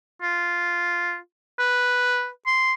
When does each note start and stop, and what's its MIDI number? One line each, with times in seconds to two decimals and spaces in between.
0.22 1.17 65
1.59 2.28 71
2.47 2.73 84